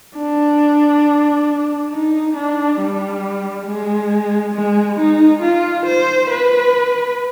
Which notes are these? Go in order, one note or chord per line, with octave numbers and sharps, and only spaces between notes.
D4
D#4
D4
G3
G#3
G#3
D#4
F4
C5
B4